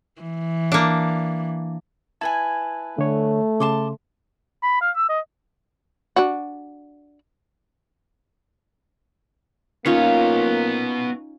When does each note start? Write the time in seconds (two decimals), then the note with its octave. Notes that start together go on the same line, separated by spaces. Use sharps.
0.22 E3
0.72 A#3 D4
2.21 E4 B4 G#5 A5
2.98 D3 A3 C#5
3.60 C#3 A5 C6 D6
4.63 B5
4.82 F5
4.96 E6
5.09 D#5
6.16 D4 F#4
9.86 A#3 B3 C#4 D#4 F4 C#5